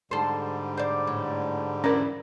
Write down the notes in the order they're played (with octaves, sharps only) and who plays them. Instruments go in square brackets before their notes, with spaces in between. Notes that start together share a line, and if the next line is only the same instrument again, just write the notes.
[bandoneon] G#2 D3 G3 [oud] A4 C5
[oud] C5 D5
A2
[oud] E2 E4 D5 [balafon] C#4 A#4